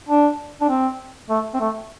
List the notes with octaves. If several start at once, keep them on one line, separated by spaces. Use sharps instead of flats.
D4
D4
C4
A3
C4
A3